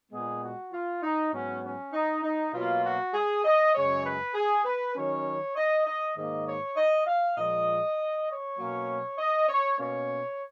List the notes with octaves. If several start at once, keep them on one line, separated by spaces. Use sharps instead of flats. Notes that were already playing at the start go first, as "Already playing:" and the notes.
A#2 G#3 B3 G#4
F#4
F4
D#4
G#2 F#3 B3 C#4
C#4
D#4
D#4
B2 F#3 A#3 F4
F#4
G#4
D#5
F#2 C#3 G#3 C#5
B4
G#4
B4
D#3 F#3 C#4 C#5
D#5
D#5
G#2 D#3 A#3 D#5
C#5
D#5
F5
A#2 F3 G#3 D#5
C#5
B2 F#3 A#3 C#4
D#5
C#5
B2 A#3 C#4 C#5